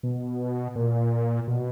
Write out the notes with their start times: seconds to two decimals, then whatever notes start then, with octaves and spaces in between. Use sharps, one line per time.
0.03 B2
0.75 A#2
1.47 B2